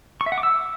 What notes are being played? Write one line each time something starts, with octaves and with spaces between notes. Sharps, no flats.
C#6
E5
F#5
D6
E6